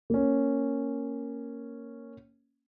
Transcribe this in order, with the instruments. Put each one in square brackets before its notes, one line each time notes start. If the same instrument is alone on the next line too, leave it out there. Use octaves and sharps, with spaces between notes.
[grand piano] A#3 C#4